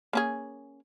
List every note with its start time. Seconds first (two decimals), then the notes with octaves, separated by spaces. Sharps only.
0.13 A#3 C#4 G#4